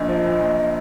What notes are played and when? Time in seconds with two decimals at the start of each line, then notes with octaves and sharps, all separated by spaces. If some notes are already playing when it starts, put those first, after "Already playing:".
Already playing: A#1 A#3 D#5
0.08 F3
0.25 A#2
0.40 A#1